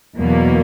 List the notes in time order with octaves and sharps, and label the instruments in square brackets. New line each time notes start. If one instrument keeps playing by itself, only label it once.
[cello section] E2 B2 F#3 A#3